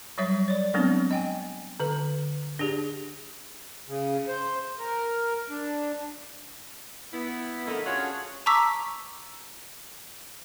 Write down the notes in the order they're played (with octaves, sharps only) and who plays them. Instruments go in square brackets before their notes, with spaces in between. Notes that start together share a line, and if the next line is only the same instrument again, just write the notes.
[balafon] F#3 G3 C#5 E5
C#5 D5
F#3 G#3 B3 C4 D4
D#5 G5 G#5
D3 B4
D4 G4 G#4
[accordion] C#3
C5
A#4
D4
[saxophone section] B3 E4
F2 D3 A3 E4 A#4 D#5
C#4 D4 F4 F#4 G#4 C#5
[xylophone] A5 A#5 C#6 D6 E6 B6